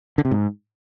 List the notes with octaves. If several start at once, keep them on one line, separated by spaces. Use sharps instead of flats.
D3
C3
G#2